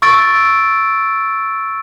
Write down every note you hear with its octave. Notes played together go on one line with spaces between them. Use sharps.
C#6 E6 A6 D7